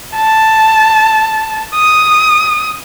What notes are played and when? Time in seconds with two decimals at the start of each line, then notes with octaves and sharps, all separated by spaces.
0.17 A5
1.75 D#6